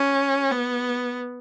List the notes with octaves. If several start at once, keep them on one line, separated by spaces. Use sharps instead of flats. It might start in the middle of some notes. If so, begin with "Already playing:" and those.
Already playing: C#4
B3